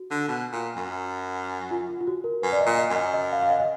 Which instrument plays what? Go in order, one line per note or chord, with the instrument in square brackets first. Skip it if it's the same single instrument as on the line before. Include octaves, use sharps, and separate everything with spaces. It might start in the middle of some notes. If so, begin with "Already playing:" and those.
Already playing: [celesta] F#4
[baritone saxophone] D3
B2
A#2
F#2
[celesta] F4
F4
F4
F#4
A#4
[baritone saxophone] F#2 [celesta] B4
[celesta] D5
D#5
[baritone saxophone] A#2
[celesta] D#5
[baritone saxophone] F#2 [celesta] D#5
[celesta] D#5
F5
F5
D#5
D#5